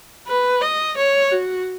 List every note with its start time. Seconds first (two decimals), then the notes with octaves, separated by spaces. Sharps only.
0.27 B4
0.62 D#5
0.97 C#5
1.32 F#4